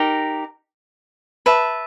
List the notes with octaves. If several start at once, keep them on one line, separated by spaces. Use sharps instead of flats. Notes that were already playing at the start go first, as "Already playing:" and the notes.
Already playing: D#4 G4 A#4
B4 E5 A5